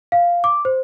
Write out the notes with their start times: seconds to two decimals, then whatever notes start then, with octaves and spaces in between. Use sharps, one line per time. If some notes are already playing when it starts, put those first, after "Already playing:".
0.12 F5
0.44 D6
0.65 C5